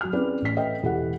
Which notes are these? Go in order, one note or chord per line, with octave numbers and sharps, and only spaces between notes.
F#3 F#4 F6
C4 C#4 E4 G#4 B4 D5
A1 C#4 B6
A4 B4 D#5 E5 G5
E1 E3 G4 A4 F#5